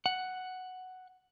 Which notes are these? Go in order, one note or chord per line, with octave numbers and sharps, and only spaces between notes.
F#5